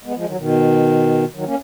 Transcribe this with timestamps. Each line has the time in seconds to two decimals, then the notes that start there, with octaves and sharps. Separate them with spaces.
0.05 G#3 B3
0.15 F3 G#3
0.26 D#3 F#3
0.37 B2 D#3
1.35 D#3 F#3
1.45 A#3 C#4